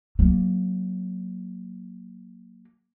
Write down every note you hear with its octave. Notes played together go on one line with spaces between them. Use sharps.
F#3 A#3